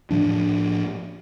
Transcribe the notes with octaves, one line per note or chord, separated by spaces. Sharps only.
A2 F3 D4